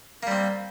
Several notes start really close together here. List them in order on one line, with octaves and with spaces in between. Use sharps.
A#3 G3 C4